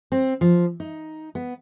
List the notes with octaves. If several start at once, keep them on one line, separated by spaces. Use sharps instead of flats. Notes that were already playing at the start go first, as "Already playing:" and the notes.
C4
F3
D#4
B3